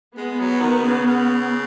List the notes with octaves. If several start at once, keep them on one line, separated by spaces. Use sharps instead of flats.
G#3 B3
F#3
D#3
C#3
C#3